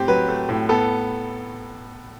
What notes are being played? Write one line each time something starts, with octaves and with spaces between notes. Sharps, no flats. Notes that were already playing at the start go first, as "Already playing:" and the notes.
Already playing: A2 C4 G4
F#3 B4
A3
A2
B3 A4